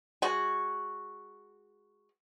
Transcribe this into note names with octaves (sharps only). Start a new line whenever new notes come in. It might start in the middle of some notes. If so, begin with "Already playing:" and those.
G#3 F#4